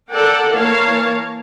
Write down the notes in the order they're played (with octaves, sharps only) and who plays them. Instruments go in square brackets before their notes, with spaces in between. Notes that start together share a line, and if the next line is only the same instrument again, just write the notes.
[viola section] A4 A#4 D5 F#5 G5
E3 A#3 A#4 C#5 F5 A5